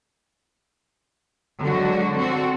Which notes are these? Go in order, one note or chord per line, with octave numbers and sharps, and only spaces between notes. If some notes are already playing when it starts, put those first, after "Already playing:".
D3 F#3 G#3 F#4
C4 F#4 A4